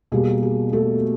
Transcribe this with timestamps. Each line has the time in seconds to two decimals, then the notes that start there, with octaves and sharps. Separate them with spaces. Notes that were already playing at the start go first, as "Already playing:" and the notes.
0.12 B2 G3 A#3 G#4
0.43 G#4
0.73 A3 A4